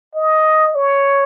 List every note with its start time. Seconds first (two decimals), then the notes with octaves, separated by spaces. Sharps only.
0.15 D#5
0.75 C#5